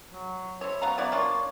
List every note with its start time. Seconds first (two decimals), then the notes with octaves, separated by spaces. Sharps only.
0.13 F#3
0.61 E4 C5 C#5
0.82 F#3 B3 F5 A#5
0.98 B3 E4 D5
1.12 A#3 D4 F4 C#5